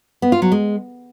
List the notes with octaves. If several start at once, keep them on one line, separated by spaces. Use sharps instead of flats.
B3
F4
F#3
G#3